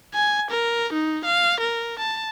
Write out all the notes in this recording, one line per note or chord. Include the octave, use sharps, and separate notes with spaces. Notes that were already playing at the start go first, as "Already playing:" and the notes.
G#5
A#4
D#4
F5
A#4
A5